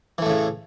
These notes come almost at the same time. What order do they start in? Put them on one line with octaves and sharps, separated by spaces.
E3 A3 A2 C#3